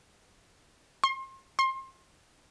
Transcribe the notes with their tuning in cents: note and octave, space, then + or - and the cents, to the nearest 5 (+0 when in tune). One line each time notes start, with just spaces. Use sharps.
C6 +35
C6 +30